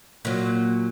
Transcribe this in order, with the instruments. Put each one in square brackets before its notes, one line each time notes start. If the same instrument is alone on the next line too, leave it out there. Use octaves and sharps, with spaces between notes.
[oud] A#2 F#3